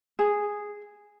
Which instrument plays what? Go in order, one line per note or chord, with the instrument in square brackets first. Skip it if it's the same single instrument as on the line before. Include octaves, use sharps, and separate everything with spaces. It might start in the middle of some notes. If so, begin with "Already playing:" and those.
[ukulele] G#4